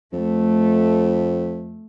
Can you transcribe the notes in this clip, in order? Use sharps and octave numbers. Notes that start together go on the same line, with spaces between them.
F2 A3